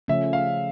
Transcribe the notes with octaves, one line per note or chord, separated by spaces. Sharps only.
C#3 F3 A3 C#4 E5
F5